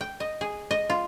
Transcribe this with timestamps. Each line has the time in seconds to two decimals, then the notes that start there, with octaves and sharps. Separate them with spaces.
0.01 G5
0.20 D#5
0.41 G#4
0.71 D#5
0.90 F4